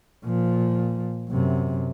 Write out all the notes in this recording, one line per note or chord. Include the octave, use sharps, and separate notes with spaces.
A#2 F3
F#2 C3